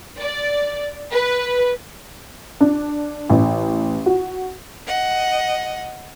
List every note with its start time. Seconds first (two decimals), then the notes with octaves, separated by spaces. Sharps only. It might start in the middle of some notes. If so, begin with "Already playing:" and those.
0.18 D5
1.11 B4
2.61 D4
3.30 A1
4.06 F#4
4.86 D#5 F#5